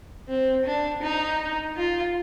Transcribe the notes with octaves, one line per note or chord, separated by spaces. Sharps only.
C4
D4
D#4
F4